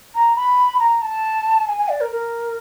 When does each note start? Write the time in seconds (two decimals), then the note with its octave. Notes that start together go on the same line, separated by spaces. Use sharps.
0.15 A#5
0.36 B5
0.79 A#5
1.02 A5
1.68 G#5
1.78 G#5
1.89 D5
2.01 A#4
2.12 A#4